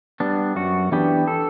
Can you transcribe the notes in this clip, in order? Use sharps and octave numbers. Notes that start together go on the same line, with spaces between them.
G3 B3 D4
F#2 F#4
E3 B3 D4 G4
A4